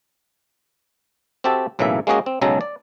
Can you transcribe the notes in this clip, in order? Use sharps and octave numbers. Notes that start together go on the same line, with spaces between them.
C4 F#4 G4 A4 E5 A5
B1 A2 C#3 E3 A#3 E5
G#3 A#3 C#4 F#4 G#4 D#5
C4
B1 C#3 F#3 G#3 A4 A#5
D5